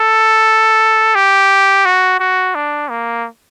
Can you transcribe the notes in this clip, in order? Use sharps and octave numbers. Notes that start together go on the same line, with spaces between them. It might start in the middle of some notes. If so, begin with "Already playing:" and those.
Already playing: A4
G4
F#4
F#4
D4
A#3